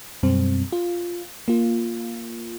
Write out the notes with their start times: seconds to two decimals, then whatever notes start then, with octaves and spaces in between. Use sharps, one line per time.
0.23 F#2 B2 G3 C4
0.73 F4
1.48 A#3 F4